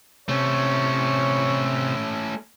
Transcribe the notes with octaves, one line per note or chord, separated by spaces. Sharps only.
C3 A3 C#4 C#5